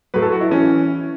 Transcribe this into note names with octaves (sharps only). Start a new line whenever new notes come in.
A2 F#3 B4
A4
F#4
E4
E3 C#4